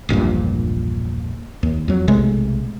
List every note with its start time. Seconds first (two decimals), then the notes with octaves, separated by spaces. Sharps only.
0.09 E1 A#1 G2 A#2
1.63 D#2
1.88 F2 F#3
2.08 B1 C3 G#3 A3